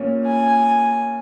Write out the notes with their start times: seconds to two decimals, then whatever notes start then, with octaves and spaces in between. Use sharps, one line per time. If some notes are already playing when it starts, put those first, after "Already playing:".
Already playing: A#2 C#4
0.26 G#5